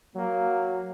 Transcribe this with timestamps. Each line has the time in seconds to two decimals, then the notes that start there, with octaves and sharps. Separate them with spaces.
0.16 F#3 A#3